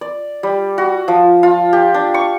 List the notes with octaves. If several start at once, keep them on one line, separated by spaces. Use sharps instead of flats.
D5
G3
F#4
F3
F4
G4
D4
C#6